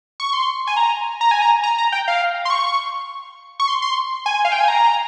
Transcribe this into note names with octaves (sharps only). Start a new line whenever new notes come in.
C#6
C6
G#5
A#5
A#5
G#5
A#5
A#5
A#5
G5
F5
C6
C#6
C#6
C6
C6
G#5
F5
G5
G#5
A#5